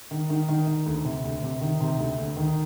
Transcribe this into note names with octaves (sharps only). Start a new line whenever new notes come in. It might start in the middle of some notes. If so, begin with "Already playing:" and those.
D#3
D#3
D#3
D#3
D2
C3
D2
C3
D#3
C3
D2
D2
D#3